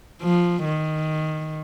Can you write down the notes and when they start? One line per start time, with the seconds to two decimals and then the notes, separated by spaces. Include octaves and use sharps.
0.22 F3
0.64 D#3